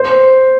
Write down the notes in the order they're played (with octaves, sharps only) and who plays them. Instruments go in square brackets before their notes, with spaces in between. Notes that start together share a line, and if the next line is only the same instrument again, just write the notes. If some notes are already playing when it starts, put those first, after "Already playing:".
Already playing: [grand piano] C5